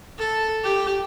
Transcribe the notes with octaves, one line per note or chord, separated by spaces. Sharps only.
A4
G4